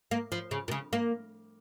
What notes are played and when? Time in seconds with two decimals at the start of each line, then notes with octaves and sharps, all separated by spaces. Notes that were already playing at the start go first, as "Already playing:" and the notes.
0.11 A#3
0.32 F3
0.51 C#3
0.68 A#2
0.71 C#3
0.93 A#3